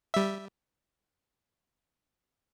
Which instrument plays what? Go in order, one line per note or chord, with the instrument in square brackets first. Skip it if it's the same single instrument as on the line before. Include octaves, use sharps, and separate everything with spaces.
[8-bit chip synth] G3 E5